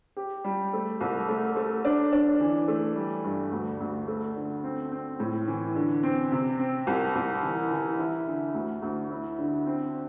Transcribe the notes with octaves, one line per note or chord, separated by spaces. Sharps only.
G4
G3
A3
C2
A3
A3
D4
D4
E3
A3
G3
G2
D2
D2
A3
D3
C4
C4
A2
E3
D3
C4
C3
C4
C2
C2
E3
E3
E4
D3
D2
D2
E4
D3
C4